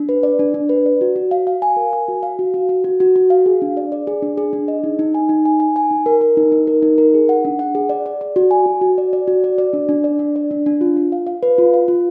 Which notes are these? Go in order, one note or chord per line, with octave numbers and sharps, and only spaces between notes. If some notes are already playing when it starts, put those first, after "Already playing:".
Already playing: D4
B4
D5
D4
D4
B4
D5
F#4
F#4
F5
F5
G#5
A#4
G#5
F#4
F5
F#4
F#4
F#4
F#4
F#4
F#4
F5
G#4
D4
D5
D5
G#4
D4
G#4
D4
D#5
D#4
D#4
G#5
D#4
G#5
G#5
G#5
D#4
A#4
A#4
D#4
D#4
A#4
D#4
A#4
G#4
F#5
D4
F#5
G#4
D5
D5
D5
F#4
G#5
F#4
F#4
D5
D5
F#4
D5
D5
D4
D4
D5
D4
D5
D4
D4
F4
F4
F5
F5
B4
F4
F5
F4